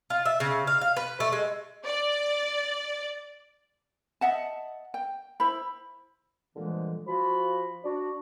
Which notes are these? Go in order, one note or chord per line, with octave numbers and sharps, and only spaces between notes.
F4
E5
C#3
F5
F5
B4
A3
G#3
D5
D#5 E5 F#5 A5
G5
E4 C5 B5
A#2 D3 E3 F3 G3 G#3
F3 F#4 B5
D4 F#4